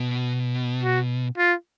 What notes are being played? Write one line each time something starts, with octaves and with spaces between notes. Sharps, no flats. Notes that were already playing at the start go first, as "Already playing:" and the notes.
Already playing: B2
F#4
F4